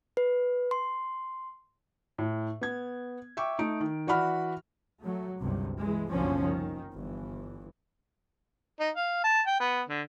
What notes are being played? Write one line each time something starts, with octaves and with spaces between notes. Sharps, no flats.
B4
C6
A2
B3 G#6
E5 G5 C#6 D6
A3 D#4 D7
D#3
E3 F#4 D5 F#5 B5 F6
F#3 A3
G1 C#2 G2 C3
E3 G#3
F#1 C2 B2 D3 F3 C#4
D#3
G1 E3
D#4
F5
A5
G5
B3
D3